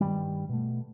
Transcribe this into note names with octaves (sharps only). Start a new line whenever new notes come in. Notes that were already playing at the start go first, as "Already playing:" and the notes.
G2 D#3 G3
B2 A3